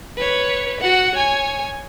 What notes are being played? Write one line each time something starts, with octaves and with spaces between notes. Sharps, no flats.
B4 C#5
F#4 F#5
C#5 G#5